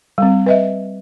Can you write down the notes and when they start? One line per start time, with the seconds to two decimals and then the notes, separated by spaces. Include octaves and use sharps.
0.18 G3 C4
0.46 B4 D#5 E5